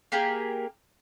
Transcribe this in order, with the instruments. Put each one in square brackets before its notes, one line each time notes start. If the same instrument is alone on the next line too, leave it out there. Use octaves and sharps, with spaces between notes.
[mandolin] A#3 G4 G#4 A#4